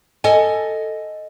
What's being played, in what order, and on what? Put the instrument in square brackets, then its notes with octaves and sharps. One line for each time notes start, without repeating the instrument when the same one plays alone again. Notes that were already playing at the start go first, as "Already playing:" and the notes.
[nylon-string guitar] A4 D#5 G#5